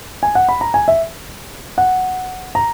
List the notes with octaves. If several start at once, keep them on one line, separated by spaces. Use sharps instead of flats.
G#5
F#5
B5
A#5
G#5
E5
F#5
A#5